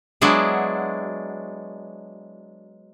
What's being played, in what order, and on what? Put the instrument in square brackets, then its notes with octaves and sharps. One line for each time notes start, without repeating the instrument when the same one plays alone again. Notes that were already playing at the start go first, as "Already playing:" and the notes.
[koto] F#3 G#3 B3 D4 E4